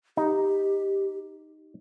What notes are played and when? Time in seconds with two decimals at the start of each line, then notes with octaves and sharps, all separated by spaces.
0.17 D#4 G4